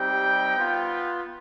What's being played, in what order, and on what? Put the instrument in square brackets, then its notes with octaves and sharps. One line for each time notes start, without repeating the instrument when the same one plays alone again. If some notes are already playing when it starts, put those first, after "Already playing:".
Already playing: [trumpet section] G3 C4 D#4 G4 G5
B3 F4